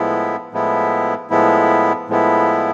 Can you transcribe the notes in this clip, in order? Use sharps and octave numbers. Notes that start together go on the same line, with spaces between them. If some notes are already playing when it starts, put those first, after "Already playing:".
Already playing: A2 F3 G#3 B3 E4
A2 F3 G#3 B3 E4
A2 F3 G#3 B3 E4
A2 F3 G#3 B3 E4